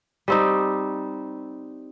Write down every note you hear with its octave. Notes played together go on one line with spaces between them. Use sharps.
G3 C4 D#4